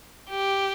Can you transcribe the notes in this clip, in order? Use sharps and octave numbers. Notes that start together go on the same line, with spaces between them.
G4